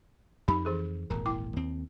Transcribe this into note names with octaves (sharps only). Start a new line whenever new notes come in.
F2 D#4 G4 B5
E3 G#4 A4
D#1 G#1 A#4 A#5
E4 G5 D6
D#2 C4